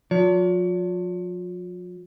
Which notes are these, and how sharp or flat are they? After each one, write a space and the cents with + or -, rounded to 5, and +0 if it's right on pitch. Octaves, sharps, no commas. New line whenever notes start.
F3 +45 C#5 +45